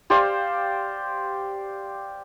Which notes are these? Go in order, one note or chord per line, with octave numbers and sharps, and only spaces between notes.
G4 C5 D5 F5